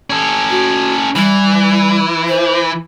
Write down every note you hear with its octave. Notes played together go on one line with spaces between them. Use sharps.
C#4 A4
F#4
E3 G3
C5